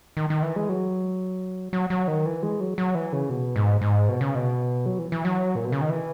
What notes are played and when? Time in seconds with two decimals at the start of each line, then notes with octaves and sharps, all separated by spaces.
0.17 D#3
0.30 D#3
0.43 E3
0.56 G#3
0.69 F#3
1.73 F#3
1.90 F#3
2.08 D#3
2.26 E3
2.43 G#3
2.60 F#3
2.78 F#3
2.95 E3
3.13 C#3
3.30 B2
3.56 G#2
3.81 G#2
4.09 B2
4.21 C#3
4.35 B2
4.86 F#3
4.99 E3
5.12 E3
5.25 F#3
5.55 A#2
5.65 B2
5.72 C#3
5.81 D#3
5.90 E3